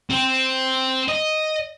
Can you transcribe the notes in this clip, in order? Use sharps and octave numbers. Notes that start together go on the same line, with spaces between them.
C4
D#5